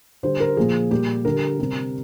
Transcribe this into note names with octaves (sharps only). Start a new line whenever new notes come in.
D3 G3 C5
A#4
A#2 F3 G#4
A#2 G3 G4
D3 G3 A#4
C3 G3